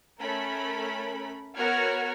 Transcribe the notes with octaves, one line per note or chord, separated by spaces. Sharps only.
A3 C#4 A#4 B5
B3 F#4 A#4 C#5 F6 G#6